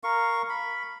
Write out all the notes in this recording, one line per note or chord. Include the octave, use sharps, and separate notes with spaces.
A#4 F5 C#6
B5